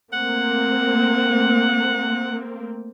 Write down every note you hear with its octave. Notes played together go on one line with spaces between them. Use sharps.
A3 A#3 C4 F#5